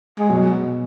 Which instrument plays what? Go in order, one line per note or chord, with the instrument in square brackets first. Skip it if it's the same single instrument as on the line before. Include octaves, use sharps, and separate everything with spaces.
[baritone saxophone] G#3
[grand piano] B2 [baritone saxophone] F#3